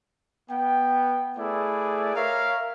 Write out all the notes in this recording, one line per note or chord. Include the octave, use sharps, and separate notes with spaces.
B3 G5
A3 E4 G#4 B4 D5
A#4 C#5 E5 F5